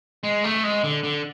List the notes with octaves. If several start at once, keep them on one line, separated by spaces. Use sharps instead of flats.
G#3
A3
G#3
D3
D3